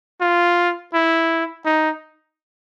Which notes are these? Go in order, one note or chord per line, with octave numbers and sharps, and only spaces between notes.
F4
E4
D#4